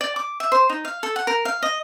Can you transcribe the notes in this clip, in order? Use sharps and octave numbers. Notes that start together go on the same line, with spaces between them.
D5
D6
E5
C5
D#4
F5
A4
F#5
A#4
F5
D#5